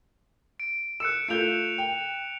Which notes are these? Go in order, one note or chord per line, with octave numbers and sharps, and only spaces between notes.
D7
E6 F#6 C#7 E7
A3 F4 G6 C#7 F7
G5